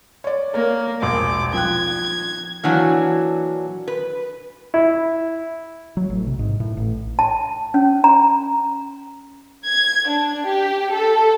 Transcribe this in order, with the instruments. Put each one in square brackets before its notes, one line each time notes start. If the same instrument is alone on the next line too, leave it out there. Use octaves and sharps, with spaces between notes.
[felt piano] C#5 D5
[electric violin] A#3 [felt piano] A#4 C#5
[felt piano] E1 A#1 [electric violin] D6
[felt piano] F3 G5 F#6 [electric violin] G#6
[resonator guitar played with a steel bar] A#2 E3 F#3 D4 F#4
B4
[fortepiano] E4
[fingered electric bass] F#3
A1
C3
G#2
A2
A1
[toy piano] A5
C#4
A#5
[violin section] G#6
D4
G4
A4